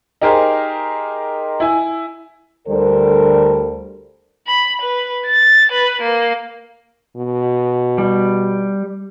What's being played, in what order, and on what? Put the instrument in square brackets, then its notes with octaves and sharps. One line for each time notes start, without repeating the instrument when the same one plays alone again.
[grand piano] D#4 G4 G#4 A#4 C5
E4 G#5
[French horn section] D2 D3 G3 A4 A#4 C5
[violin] B5
B4
A6
B4
A#3
[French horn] B2
[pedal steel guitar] G3